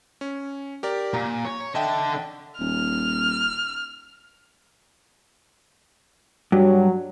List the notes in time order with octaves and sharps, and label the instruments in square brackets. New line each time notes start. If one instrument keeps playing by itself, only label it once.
[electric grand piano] C#4
G4 A#4 D5
[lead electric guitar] A#2 [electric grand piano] A#5
[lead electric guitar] C#5
[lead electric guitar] D3 A5 [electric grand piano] D#5 E5 G5
[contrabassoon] D#1 [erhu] F6
[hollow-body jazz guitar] G2 [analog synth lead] F#3